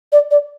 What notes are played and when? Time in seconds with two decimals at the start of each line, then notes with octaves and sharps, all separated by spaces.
0.12 D5
0.31 D5